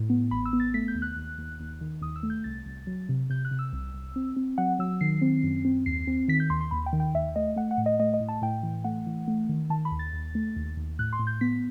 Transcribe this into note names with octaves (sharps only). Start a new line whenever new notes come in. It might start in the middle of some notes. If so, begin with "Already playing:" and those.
Already playing: A2
B3
A1 B5
E6
B3
A6
A3 B6
G6
D#2
F#6
D#2
D#2
D#2
D#3
D#2 D#6
E6
A3
G6
C2 A6
C2
F#3
C3
C3 G6
F#6
C3
E6
C2
C2
C4
C4
F#3 F#5
F#3 E6
D#3 C7
C4
F#2
C4
D#2 C7
C4
D#3 B6
G6
D#2 C6
C6
D#2 B5
G5
D#3
G5
D#2 E5
A3 D#5
A3 F#5
F#5
A2
D#5
A3 D#5
D#5
A2
A5
A2 G5
E3
A3 F#5
E3
A3
D#3
D#3 A5
B5
D#2
A6
D#2
A3
D#2
D#2
A2 F#6
C6
A2
G6
B3 B6